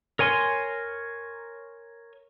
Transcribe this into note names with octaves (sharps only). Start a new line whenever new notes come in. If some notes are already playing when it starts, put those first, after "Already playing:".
A#4 C#5 G#5 C6